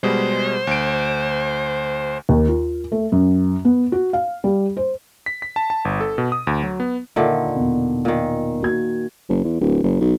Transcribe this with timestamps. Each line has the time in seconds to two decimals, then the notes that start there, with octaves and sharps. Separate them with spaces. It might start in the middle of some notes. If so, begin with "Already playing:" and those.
0.04 B2 G3 G#3 C5
0.67 D2 D7
2.29 D#2
2.48 F4
2.92 A3
3.12 F#2
3.65 B3
3.92 F#4
4.13 F5
4.44 G3
4.77 C5
5.26 B6
5.42 B6
5.56 A5
5.70 A5
5.85 G1
6.01 A4
6.18 B2
6.32 D#6
6.47 D2
6.63 F#3
6.80 B3
7.16 A#2 D3 D#3 A#4 E5
7.56 E2 B2
8.05 A#2 D#3
8.60 A#3 F#4 G#6
9.29 F#1
9.44 E2
9.60 D1
9.84 F#1
10.01 B1